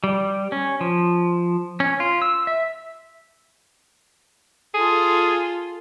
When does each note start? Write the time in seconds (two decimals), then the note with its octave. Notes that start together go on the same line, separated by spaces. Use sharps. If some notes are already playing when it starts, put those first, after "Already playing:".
0.04 G3
0.52 C#4
0.81 F3
1.80 C#4
2.00 F4
2.22 E6
2.47 E5
4.74 F4 G#4 A4